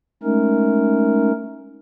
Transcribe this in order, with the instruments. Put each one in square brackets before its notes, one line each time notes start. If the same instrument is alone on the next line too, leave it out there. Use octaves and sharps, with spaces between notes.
[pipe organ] G#3 A3 C#4 D#4 A#4